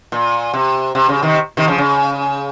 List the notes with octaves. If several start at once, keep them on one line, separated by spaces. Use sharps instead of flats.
A#2
C3
C3
C#3
C3 D#3
C3 D#3
C#3 F3
C#3